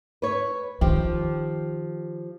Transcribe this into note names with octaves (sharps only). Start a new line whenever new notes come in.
B4 C#5
D#3 F3 G4